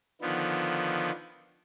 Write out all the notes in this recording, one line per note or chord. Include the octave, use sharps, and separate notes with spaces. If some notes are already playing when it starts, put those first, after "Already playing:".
D3 D#3 F3 B3